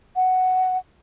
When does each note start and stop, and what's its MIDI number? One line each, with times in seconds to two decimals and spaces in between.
0.16 0.78 78